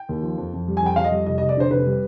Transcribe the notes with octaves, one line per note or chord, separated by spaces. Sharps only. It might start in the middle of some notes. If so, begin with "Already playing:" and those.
Already playing: G5
D#2
F3
F2
F2
G3
G#5
F2 G5
F2 F5
D#5
G3
F1 D#5
D#5
F1
D5
D3 C5
F1 B4
G3